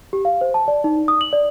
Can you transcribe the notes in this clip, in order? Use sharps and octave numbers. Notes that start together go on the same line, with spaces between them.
G4
F5
C5
A5
D5
D#4
D#6
F#7
D5